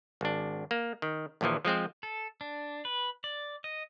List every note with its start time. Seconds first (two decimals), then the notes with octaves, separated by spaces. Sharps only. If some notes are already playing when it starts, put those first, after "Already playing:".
0.21 G#1 D4
0.71 A#3
1.02 D#3
1.41 A#1 D#2 A#2 E3 F3
1.65 F3 G#3 C4 C5
2.03 A4
2.41 D4
2.85 B4
3.24 D5
3.64 D#5